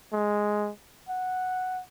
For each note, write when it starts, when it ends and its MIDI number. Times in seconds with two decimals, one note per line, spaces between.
0.13 0.70 56
1.09 1.82 78